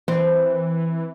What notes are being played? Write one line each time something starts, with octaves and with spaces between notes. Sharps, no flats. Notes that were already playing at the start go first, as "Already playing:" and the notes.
E3 C4